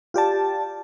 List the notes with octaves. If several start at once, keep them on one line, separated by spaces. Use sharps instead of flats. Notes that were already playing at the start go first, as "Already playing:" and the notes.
F4 G4 D5 A5